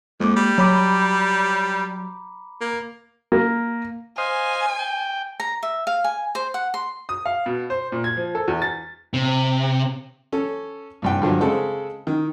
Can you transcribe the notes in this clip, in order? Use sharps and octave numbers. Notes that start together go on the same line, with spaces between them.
F2 G#3 A#3 D6
G3
F#3 A#5 B5 D6
A#3
A#3
C5 D#5 F5 G#5
G5
A#5
E5
F5
G#5
C5
F#5
C6
D#6
F5
B2
C5
A#2
G#6
F3
A4
E2
A6
C3
C#4 A4
C2 G2 G5
G2 D3 F3 F#3
C#3 G#3 C4 A4 C5
D#3